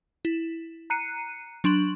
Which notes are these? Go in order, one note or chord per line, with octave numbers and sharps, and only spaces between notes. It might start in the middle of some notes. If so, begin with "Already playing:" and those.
E4
A#5 F#6 C7 C#7 D#7
F#3 D4 C6 C#6 F#7